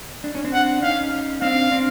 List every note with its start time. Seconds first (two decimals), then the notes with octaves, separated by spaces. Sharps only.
0.24 D4
0.35 C#4
0.45 C4 D4
0.53 F#5
0.83 C#4 D#4 F5
1.42 C4 D4 F5
1.71 C4 D4